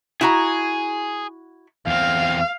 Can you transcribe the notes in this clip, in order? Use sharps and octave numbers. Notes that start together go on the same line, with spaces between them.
E4 F#4 G#4 A#5
E2 C4 F5